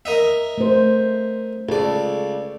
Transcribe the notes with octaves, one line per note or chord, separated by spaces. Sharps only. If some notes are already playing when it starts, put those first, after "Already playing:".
A#4 D#5 E5
A3 C5
C#2 A4 D5